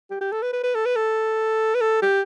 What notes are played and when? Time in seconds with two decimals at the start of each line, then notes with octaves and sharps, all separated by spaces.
0.11 G4
0.21 G4
0.32 A4
0.42 B4
0.53 B4
0.64 B4
0.75 A4
0.86 B4
0.96 A4
1.75 B4
1.81 A4
2.02 G4